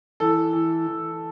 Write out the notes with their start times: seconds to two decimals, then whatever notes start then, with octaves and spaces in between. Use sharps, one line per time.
0.20 E3 A4
0.53 E3
0.87 E3